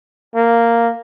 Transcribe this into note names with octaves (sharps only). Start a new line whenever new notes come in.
A#3